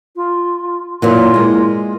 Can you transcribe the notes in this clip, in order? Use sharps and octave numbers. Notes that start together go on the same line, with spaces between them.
F4
F#2 A#2 E3 F4
G#3 A#3